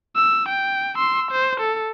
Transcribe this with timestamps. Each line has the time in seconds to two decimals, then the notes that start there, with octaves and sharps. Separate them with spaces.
0.16 E6
0.49 G5
0.95 C6 E6
1.31 C5
1.60 A4